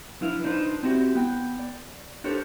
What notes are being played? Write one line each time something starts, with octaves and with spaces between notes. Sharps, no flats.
F3 D4 E4 B4 F5
D4 D#4 F4 B4 C5
C4 D#4 E4 F#4 G4
B3 G5
D5
D4 G4 A4 A#4 C5 C#5